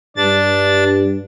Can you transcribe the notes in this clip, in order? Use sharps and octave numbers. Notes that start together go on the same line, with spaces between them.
G2 D4 A6